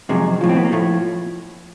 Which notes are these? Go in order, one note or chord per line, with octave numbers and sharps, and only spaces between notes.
F2 C3 D#3 F#3 G#3
A2 F3
C4
B3
A#3
A2 F3 A3